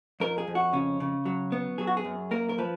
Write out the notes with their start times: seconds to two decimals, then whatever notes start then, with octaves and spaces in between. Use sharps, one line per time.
0.20 F2 A#4
0.38 G#4
0.47 F2
0.55 F#4
0.73 C#3 C#4
1.00 C#3
1.26 F#3
1.52 B3
1.78 F#3 G#4
1.87 F#4
1.97 G#4
2.04 F#2
2.31 A#3 A#4
2.49 A#4
2.58 F3 B4